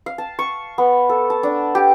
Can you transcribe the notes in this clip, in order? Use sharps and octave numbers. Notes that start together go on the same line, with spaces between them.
F5
A5
C#6
B3
A4
A5
D4
G4